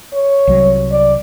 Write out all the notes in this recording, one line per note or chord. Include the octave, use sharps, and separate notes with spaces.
C#5
C2 F#3
D5